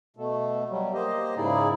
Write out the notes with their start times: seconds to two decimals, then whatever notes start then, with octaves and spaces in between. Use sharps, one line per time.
0.17 B2 A3
0.70 F#3 G3
0.94 A#3 G4 C5 D#5
1.37 G#2 C#3 D#4 E4 G#4 D5